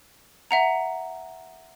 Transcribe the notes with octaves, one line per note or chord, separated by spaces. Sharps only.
E5 F#5 A#5